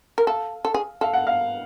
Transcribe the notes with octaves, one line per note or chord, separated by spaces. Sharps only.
A#4
A4 F5
A4
G#4
A4 F5
F#5
F5